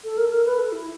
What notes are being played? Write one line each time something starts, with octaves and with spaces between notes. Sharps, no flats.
A4
A#4
A4
A#4
B4
A4
E4